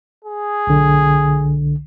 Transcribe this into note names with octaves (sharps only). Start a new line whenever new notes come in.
G#4
B1 D3